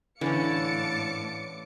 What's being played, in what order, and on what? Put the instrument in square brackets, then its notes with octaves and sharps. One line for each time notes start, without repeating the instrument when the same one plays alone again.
[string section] A2 D6 C#7 [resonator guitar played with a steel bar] D3 C#4 [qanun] E3 [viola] F5 A5